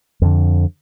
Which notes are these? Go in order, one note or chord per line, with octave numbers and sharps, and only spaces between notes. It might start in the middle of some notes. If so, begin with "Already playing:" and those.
F2 D3